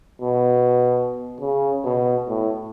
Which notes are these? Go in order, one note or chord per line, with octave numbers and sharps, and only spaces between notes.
B2
C#3
B2
A2